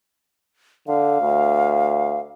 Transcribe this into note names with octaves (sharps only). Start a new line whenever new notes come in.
D3 F5
D2